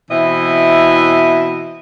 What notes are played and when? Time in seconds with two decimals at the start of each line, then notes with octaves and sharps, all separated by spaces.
0.11 B2 E3 C4 E4 D#5 E5